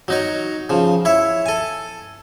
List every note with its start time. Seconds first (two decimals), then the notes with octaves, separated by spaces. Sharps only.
0.08 F#3 D#4 C#5
0.70 C#3 F3
1.05 E4 C#5 E5
1.46 A4 G#5